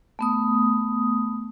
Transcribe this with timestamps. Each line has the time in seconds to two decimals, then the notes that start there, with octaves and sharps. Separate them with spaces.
0.19 A3 B3 D#6